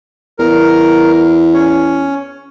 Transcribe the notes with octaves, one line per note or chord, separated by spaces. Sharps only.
E2 A#4
C#4